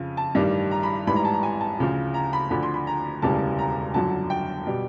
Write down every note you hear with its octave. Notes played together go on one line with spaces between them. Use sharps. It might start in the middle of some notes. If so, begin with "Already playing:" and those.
Already playing: F2 C#3 F3
A5
A1 G2 D#3 G3
A#5
B5
A1 G#2 E3 G3 B5
A#5
A5
A#5
G#5
A5
D2 C#3 F3
A#5
B5
D2 D3 F3 B5
C6
B5
A#5
E1 D2 C#3 E3 G3 A5
A#5
G1 F#2 D3 F#3 A5
G5
B2 G3